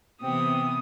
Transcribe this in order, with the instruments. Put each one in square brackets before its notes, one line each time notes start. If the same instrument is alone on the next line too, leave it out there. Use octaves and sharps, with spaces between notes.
[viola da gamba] C3 E3 B3 [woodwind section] C4 [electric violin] D#6